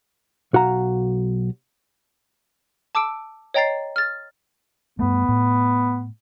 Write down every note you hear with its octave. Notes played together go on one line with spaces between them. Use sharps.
B1 F#4 F5 A#5
A5 D6 E6 D7
C#5 D#5 G5 A#5 A6 C7
F6 A6
G2 A3 B3
A2